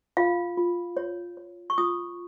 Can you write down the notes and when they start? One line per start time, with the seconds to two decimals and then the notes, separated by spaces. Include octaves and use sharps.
0.17 F4 F5
0.58 F4
0.97 C#5
1.37 C#5
1.70 C#6
1.78 F4 D#6